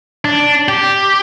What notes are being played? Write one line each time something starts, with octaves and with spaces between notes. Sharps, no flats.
D4
G4